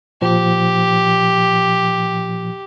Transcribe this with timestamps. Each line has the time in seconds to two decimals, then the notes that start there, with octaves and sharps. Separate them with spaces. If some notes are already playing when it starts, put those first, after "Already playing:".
0.22 A#2 F3 G4